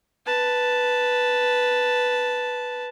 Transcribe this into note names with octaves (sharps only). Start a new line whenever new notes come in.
B4 A5